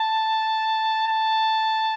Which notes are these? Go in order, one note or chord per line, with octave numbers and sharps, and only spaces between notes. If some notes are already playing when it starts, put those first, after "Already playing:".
Already playing: A5
A5